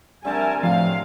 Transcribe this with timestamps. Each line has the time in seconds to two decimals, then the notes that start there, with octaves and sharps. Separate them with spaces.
0.25 D3 G3 A3 C4 A#4 G#5 A5
0.63 A2 C3 F3 F5